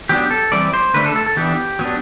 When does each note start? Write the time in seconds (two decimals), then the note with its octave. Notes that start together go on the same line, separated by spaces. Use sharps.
0.09 F#3 B3 D4 G4
0.31 A4
0.52 E3 G3 C4 D5
0.74 C5
0.94 D3 A3 D4 B4
1.06 A4
1.16 A4
1.26 A4
1.36 E3 B3 D4 G4
1.79 F#3 B3 D4